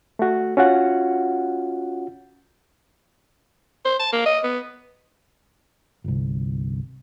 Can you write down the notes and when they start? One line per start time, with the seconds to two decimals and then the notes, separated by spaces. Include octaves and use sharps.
0.19 A3 F#4
0.57 C#4 F4 F#4 F#5
3.85 C5
3.99 A5
4.12 A#3
4.26 D#5
4.43 B3
6.04 G1 C2